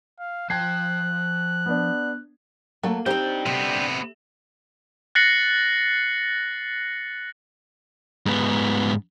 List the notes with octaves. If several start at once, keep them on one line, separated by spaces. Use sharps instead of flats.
F5
F3 G5 A5 F#6 G#6 C7
B3 D4
F#3 A3 A#3
C4 D4 D#4 G4 C5 G5
C3 A3 B3
F#6 A6 A#6 C7 C#7 F#7
G#2 B3